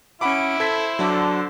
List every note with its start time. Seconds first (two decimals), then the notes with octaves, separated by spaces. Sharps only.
0.21 C#4 E4 F#5 B5 D6 D7
0.60 A4 C5 G#6 B6
0.99 D3 F#3 D4